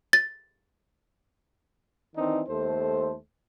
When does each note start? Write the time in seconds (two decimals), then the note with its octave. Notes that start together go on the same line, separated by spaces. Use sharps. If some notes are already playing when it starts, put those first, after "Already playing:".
0.13 A6
2.16 D#3 E3 C4 D4 D#4
2.49 D#2 A3 A4 C5